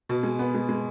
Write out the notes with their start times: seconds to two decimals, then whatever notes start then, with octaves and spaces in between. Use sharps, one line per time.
0.09 B2
0.23 G#3
0.39 B3
0.54 G#3
0.69 G#3